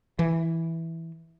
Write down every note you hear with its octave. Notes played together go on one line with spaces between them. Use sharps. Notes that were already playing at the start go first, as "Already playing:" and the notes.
E3